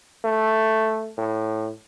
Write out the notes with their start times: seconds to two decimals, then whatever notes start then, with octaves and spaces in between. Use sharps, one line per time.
0.25 A3
1.18 A2